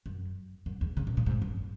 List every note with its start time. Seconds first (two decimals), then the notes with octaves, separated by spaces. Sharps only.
0.06 F#2
0.66 F#2
0.81 E2
0.97 C#3
1.07 B2
1.17 A#2
1.26 G#2
1.42 F#2